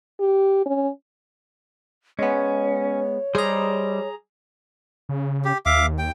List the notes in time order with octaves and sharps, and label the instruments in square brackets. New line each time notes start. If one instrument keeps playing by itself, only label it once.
[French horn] G4
C#4
[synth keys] G#3 B3 [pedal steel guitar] C#4 [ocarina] C#5
[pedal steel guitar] G3 C5 D#5 [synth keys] G#4 A#5
[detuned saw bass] C#3
[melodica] G4
[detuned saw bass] D#2 [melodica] E5 F5 D6
[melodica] G5